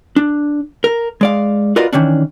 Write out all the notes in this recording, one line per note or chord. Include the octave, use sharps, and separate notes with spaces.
D4
A#4
G#3 D5 F5
F4 F#4 A#4 B4 D5 D#5
D#3 E3 C#4 D4